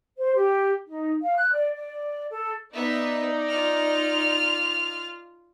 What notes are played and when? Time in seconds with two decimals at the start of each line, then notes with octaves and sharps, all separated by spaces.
0.18 C5
0.35 G4
0.88 D#4
1.22 F5
1.35 F#6
1.53 D5
1.75 D5
2.31 A4
2.73 B3 D#4 D5 E5
3.49 F4 F6